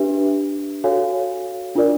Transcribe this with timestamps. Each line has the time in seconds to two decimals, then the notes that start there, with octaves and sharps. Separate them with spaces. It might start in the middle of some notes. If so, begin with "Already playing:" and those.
Already playing: D4 G4 B4 E5
0.84 F#4 A4 C#5 F5 G#5
1.75 D4 F4 A#4 D5